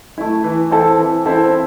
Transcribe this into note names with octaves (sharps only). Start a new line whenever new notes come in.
A3 E4
E3
C4 E4 A4
E3
C4 E4 A4